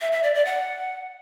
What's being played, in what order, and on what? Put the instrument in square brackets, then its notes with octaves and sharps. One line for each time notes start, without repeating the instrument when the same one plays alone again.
[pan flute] E5
E5
D5
D5
F#5